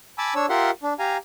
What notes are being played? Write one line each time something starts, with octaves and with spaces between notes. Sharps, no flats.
G#5 A5 B5 D6 E6
D4 C#5 E6
F4 G4 A#4 E5 F#5 C6
D4
G4 F5 G#5 A#5